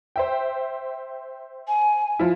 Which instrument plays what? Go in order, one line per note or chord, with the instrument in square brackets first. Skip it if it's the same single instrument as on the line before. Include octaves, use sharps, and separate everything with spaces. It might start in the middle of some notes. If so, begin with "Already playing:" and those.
[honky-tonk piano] C5 E5 G5
[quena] G#5
[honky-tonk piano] F3 E4